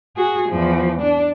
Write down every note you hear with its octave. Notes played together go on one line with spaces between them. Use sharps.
F#4 G#4
E2 F3
D4